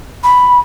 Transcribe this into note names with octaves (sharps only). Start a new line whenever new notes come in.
B5